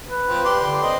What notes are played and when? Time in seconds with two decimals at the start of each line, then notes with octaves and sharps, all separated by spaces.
0.09 B4
0.29 F3 C4
0.45 G4 D5 C6
0.63 D3
0.82 C4 D#5 C6